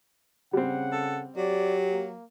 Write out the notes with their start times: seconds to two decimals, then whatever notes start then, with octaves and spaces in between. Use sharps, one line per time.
0.53 C#3 G3 C4 F#5
0.92 A4
1.37 F#3 G4 D5
1.92 A#3